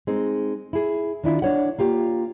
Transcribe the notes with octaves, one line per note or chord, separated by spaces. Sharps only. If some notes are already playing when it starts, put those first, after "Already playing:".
G#3 C4 D#4
E4 G#4
D#3 D4 E4 F4
D4 C#5 F#5
A#3 F4 G4